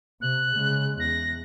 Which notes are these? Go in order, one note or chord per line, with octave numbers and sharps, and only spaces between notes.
C3 F#6
C#3 G#3
E2 A#6